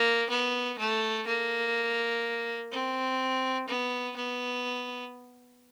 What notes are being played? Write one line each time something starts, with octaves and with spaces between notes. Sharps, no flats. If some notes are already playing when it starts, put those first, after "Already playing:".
Already playing: A#3
B3
A3
A#3
C4
B3
B3